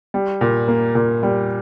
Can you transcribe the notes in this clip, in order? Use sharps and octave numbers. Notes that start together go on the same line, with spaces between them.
G3
A#2
A#3
A#2
G3